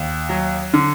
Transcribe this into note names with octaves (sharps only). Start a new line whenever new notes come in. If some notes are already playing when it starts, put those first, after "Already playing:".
Already playing: D#2
F#3
D3